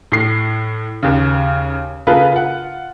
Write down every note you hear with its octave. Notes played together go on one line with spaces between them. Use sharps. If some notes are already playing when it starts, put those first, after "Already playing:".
A2 C7
D#2 C#3
C#3 A#3 F4 G#4 A4 B4
F4 F#5